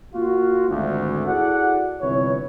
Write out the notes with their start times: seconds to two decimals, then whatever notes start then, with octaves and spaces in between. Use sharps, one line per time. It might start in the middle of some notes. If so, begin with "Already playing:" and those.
0.13 A#3 F4 F#4
0.69 G#1 D2
1.28 E4 F#4 G#4 A4 D5 F#5
2.01 G1 C2 C3 E3 B4 C#5